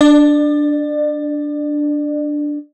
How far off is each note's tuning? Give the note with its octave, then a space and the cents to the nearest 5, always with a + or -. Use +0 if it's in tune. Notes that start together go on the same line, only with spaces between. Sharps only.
D4 +0 D5 +35